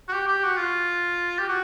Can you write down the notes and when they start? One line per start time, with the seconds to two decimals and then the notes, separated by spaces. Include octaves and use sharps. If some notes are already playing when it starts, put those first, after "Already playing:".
0.09 F#4
0.13 G4
0.28 G4
0.44 F#4
0.58 F4
1.39 G4
1.48 F#4